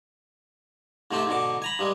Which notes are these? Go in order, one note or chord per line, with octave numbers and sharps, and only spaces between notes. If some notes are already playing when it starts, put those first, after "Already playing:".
G#2 C3 A3 C4 G4
G#2 B2 D3 D6
G#5 A#5 B5
G2 G3 G#3